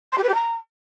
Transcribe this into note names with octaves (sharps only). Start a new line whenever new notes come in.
C6
G4
B4
G4
A#5